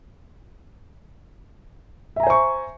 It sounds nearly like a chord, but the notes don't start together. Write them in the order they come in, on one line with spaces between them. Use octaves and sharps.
E5 A#5 G#5 C5 C#6